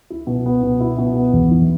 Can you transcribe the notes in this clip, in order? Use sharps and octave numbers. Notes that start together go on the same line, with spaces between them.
E4
B2
B3
B2
E4
B2
B3
E2
E3